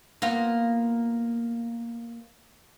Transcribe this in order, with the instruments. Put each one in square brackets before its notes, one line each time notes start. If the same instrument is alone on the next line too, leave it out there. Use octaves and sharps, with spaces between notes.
[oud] A#3 B3 F4